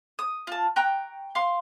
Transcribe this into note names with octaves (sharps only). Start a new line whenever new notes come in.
D#6
F4 A5
G5 A#5 C#6 F#6
F5 C6